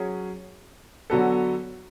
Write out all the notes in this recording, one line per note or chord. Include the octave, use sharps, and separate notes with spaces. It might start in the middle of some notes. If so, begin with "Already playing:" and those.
Already playing: F#3 C#4 G#4
D3 F#3 B3 F#4 A4